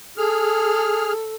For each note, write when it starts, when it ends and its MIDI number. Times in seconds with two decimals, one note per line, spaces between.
0.17 1.13 68
0.17 1.35 69
0.17 1.13 89